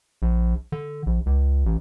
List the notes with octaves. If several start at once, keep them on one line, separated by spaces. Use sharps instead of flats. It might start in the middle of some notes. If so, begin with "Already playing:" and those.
A#1
D3
A#1
C#2
A1